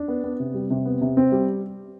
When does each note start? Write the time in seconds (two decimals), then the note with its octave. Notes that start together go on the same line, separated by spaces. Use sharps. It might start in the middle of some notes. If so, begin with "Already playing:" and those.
Already playing: D4
0.08 B3
0.24 B3
0.40 C3
0.54 G3
0.70 C3
0.85 B3
1.01 C3
1.17 C4
1.32 G3